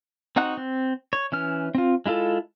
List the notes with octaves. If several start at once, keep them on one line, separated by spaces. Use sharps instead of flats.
C4 D#4 F#4 F#5 F#6
C4
C#5
E3 C#4 F6
C4 F4
G#3 E4 F4 A4